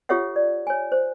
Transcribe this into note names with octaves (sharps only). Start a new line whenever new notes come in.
F4 G4 A4 C#5 E5 F#5
D5
C#5 G#5
C5